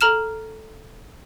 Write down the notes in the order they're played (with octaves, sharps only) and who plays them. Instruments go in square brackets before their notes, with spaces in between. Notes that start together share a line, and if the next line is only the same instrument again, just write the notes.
[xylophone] A4 A#5 F6 E7